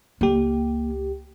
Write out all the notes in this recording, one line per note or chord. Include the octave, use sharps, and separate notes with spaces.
C#2 A#3 G4